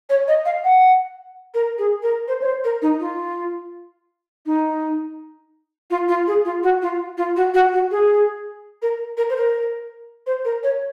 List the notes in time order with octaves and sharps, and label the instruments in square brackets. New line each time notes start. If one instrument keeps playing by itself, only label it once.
[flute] C#5
D#5
F5
F#5
A#4
G#4
A#4
C5
C#5
C5
A#4
D#4
F4
D#4
F4
F4
G#4
F4
F#4
F4
F4
F#4
F#4
F#4
G#4
A#4
A#4
C5
A#4
C5
A#4
C#5